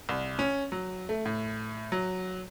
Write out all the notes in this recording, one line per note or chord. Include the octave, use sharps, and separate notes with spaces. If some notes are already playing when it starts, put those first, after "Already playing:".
C2
C#4
F#3
A3
A2
F#3